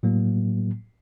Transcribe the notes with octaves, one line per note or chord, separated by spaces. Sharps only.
A2 F#3 A#3